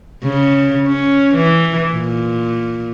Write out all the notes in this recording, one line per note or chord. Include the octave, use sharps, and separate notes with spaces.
C#3
C#4
E3
A#2